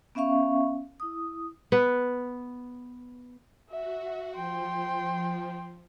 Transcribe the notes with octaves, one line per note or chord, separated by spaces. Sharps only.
B3 C#4 E5 F5 C#6
E4 D#6
B3 B4
F#4 E5
F3 G5 C6